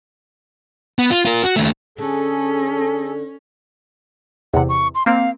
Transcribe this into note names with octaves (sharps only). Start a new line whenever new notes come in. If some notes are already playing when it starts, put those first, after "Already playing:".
B3
F4
F4 A#4
F#4
D#2 A3
D3 C#4 G#4 A4
E2 C3 F#5
C#6
C6
A#3 C4 F5